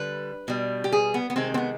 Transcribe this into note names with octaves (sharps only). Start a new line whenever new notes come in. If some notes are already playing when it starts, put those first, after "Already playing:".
Already playing: D3 G3 B4
B2 G3
G4
G#4
B3
B3
C3 D#3 G#3 C4
C4
B3